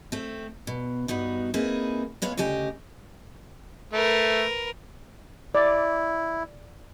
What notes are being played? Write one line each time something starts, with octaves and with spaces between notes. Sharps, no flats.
A3 C4
B2
G2 B3 D#4 F#4
A#3 C4 D#4 E4 G#4 B4
G#3 B3 C#5 F5
D2 C#3 G4 D#5 G#5
A3 A#4 B4
E4 D5